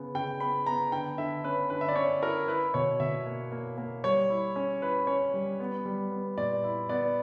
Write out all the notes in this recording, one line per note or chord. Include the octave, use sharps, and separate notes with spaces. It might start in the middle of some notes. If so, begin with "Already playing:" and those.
Already playing: C#3 B3
C#3 G5
B3 B5
B3 A#5
D3 G5
D3 E5
C#4 B4
D3 B4
E5
D5
C#4 C#5
E4 A#4
E4 B4
B2 C#5
B2 E5
A#3
A#3
A#3
G3 C#5
E4
C#4
E4 B4
C#4 C#5
G3
B3
G3
B3
A#2 D5
E4
B3 D5